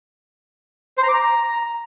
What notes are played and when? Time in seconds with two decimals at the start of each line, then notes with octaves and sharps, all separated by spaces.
0.98 C5
1.03 A#5
1.09 D6
1.14 A#5